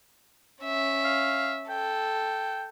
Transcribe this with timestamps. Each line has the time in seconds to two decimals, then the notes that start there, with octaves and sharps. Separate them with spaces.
0.63 C#4 E5
1.05 F5
1.70 A4 G5